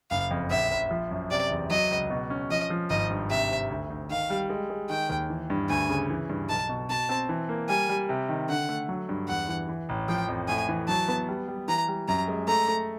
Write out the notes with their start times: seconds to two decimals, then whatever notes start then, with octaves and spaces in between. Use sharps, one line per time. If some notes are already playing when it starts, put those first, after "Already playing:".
0.11 F#1 F5
0.31 F2
0.51 A#1 E5
0.71 A#1
0.91 F3
1.11 F#2
1.31 C3 D5
1.51 E2
1.70 F#3 D#5
1.91 C#2
2.10 B2
2.30 C#4
2.50 F3 D#5
2.70 F3
2.90 G#1 D#5
3.10 G2
3.30 C3 E5
3.51 C3
3.70 D2
3.90 D2
4.10 D#3 F5
4.30 G3
4.50 G#3
4.70 G#3
4.90 D#3 G5
5.09 D#2
5.30 E3
5.50 G2
5.69 D2 G#5
5.89 C#3
6.09 E3
6.29 G2
6.49 B1 A5
6.69 B2
6.89 B2 A5
7.09 C4
7.29 E3
7.49 A#3
7.69 G3 G#5
7.89 G3
8.09 C3
8.29 D#3
8.49 D3 F#5
8.69 A3
8.89 F#3
9.09 G2
9.28 E2 F#5
9.49 E3
9.69 E3
9.89 A1
10.08 F3 G5
10.29 F2
10.49 A2 G#5
10.69 E3
10.88 F#3 A5
11.08 B3
11.28 G3
11.48 G3
11.68 E3 A#5
11.88 G3
12.08 F#2 A#5
12.28 G#3
12.48 A3 A#5
12.68 A3